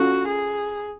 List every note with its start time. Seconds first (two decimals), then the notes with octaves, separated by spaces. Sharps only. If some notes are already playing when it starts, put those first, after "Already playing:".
Already playing: C#4 F4 F#4 A4
0.28 G#4